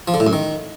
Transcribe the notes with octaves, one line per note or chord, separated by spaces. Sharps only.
F3
D3
A2
F#2
D#3